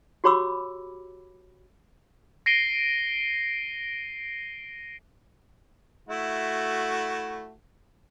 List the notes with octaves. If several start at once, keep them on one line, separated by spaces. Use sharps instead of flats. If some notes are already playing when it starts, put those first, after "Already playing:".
F#4 G4 C#5 B5 D6 E6
A#6 C7 D7 D#7 G7
A3 E4 F#4